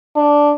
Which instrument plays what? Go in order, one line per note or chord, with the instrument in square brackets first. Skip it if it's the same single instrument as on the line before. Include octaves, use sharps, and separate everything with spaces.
[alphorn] D4